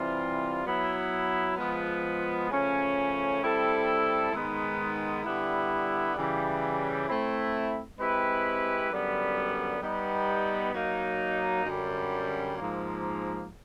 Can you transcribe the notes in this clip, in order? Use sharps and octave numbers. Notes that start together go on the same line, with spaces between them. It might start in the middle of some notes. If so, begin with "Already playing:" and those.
Already playing: C3 E3 G3 C4 F4
F#3 B3 E4
F3 G#3 B3
C#3 F3 A3 C#4
G3 C4 E4 A4
G#2 D#3 G#3 B3
D3 G3 B3 E4
C#3 E3 G3
A3 C4 E4
G#3 C4 E4 G4 B4
F#2 D3 G3 B3
G3 B3 D#4
F#3 A#3 D#4
F#2 D3 G3
G#2 F3 A#3